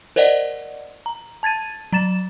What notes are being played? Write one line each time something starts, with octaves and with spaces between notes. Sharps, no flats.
A#4 C5 D5 D#5 F#5
A#5
A5 G#6 A6 D#7
F#3 A#5 A6 E7